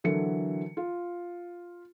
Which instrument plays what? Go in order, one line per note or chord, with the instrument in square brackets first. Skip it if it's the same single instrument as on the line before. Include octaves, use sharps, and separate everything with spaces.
[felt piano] D3 E3 F#3 A4 A#4 C#7
F4